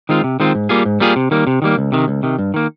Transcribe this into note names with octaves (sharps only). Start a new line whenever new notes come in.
D#3 G#3 C4 F4
C3
D#3 G#3 C4 F4
G#2
G3 A#3 F4 G#4
G#2
G3 A#3 F4 G#4
C3
D#3 G3 A#3
C3
D#3 G3 A#3
C#2
C3 D#3
C#2
C3 D#3
G2
D#3 A#3